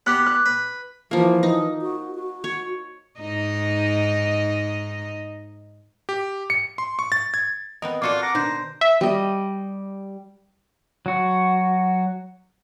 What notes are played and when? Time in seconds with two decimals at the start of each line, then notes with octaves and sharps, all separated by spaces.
0.06 B3 G4 F#6
0.26 F#6
0.46 B4
1.11 E3 F3 A#3
1.43 D#4
1.82 F#4
2.15 F#4
2.44 C#5
3.20 G#2 D#4 D#5
6.09 G4
6.50 C#7
6.78 C6
6.99 C#6
7.12 A6
7.34 G#6
7.82 B3 C4 A#4 D#5
8.02 A#3 F4 F#4 A4 D5
8.22 F#5 A#5 D6
8.35 B2 D#3 D4 C5
8.81 E5
9.01 G3 D#5
11.06 F#3 F#4